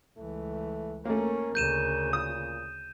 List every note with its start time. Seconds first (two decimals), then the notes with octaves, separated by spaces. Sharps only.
0.18 C#2 E3 A3
1.05 A3 A#3 C#4 A#4
1.55 D2 C#3 G6 D#7 E7
2.13 A#2 D#6